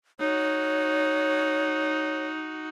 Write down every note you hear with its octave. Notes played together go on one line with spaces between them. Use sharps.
D#4 F#4 C#5